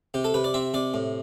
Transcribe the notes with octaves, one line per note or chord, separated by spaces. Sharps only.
C3 G4
A4
C3 B4
D5
C4 E5
C3 D5
A2